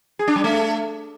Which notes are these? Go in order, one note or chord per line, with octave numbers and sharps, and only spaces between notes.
G#4
D4
G3
A3